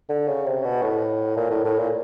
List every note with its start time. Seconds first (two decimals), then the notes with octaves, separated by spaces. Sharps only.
0.09 D3
0.27 C#3
0.46 C3
0.64 B2
0.82 A2
1.37 A#2
1.50 A2
1.64 A2
1.78 A#2